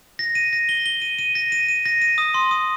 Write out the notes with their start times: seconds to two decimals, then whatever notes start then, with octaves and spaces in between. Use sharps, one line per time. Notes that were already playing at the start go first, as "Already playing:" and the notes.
0.19 A#6
0.35 D#7
0.53 A#6
0.69 G7
0.86 G7
1.02 D#7
1.19 D#7
1.35 A#6
1.52 D#7
1.69 D#7
1.86 A#6
2.02 D#7
2.18 D#6
2.34 C6
2.51 D#6